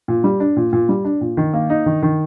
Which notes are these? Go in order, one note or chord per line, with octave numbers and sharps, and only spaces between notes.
A#2
G3
D4
A#2
A#2
G3
D4
A#2
D#3
A#3
D#4
D#3
D#3